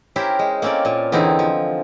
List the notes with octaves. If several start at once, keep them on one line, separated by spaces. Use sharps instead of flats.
C#4 E4 G4 A#4 C5 A#5
G#3
A#3 C4 C#4 A4 D5
A#2
E2 D3 C4 D#4 E4
F3